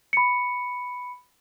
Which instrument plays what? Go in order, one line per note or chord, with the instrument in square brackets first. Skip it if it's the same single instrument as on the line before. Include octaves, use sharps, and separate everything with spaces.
[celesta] B5 C#7